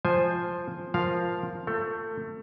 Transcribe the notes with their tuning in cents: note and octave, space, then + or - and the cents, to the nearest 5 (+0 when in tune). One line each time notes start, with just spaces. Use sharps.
F3 +0 C5 +0 G#5 -10
F3 +0 A#4 +10 F5 +0
A3 +20 A4 +30